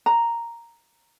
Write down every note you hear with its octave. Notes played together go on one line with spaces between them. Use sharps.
A#5